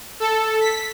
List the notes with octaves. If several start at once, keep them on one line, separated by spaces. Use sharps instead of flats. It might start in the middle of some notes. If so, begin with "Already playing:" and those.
A4
B6